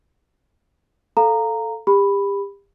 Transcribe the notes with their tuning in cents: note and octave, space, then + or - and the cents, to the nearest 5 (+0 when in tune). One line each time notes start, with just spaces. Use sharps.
A4 +0 F5 +0 A#5 -10
G4 +30 B5 +0